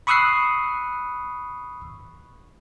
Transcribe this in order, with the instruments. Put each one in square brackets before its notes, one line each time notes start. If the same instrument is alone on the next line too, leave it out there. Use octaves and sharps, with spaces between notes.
[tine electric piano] B5 C#6 D#6 E6 F#6 C7